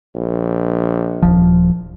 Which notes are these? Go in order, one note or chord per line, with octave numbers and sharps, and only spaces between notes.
A#1
D#1 C2 F3